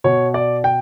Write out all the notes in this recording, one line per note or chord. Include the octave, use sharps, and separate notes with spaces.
B2 C#5
D5
G5